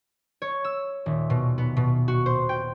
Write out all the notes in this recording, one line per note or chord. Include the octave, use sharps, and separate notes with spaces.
C#5
E6
D#1
B2
B3
B2
F#4
C5
G5